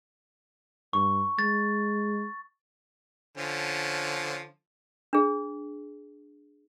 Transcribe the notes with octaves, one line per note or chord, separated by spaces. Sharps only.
G2 C#6
G#3 A6
D3 F3 C#4
D4 G#4